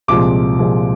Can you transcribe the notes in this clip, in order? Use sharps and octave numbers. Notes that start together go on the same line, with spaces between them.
C2 A#2 F3 G#3 D6
C2 A#2 F3 G#3